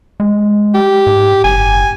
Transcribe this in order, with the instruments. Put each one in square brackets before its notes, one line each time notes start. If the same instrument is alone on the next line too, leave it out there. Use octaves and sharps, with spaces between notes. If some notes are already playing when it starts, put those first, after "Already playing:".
[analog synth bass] G#3
[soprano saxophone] G4
[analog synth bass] G#2
[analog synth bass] F#1 [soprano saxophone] G#5